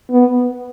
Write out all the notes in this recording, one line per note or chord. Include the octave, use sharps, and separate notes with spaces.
B3